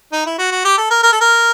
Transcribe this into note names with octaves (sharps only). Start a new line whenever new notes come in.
D#4
E4
F#4
F#4
G4
A4
A#4
A#4
A4
A#4